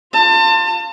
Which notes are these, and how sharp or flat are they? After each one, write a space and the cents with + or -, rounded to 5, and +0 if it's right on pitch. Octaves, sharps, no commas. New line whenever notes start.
F4 +0 A5 +30